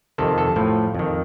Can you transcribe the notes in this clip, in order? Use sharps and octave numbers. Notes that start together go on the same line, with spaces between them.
F2 C3 D#3 A4
A4
A2 F3
F2 D#3